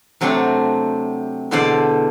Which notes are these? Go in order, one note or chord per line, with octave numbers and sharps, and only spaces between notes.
C3 F#3 A3 C4 D4
E2 B2 D3 A4 C5 D5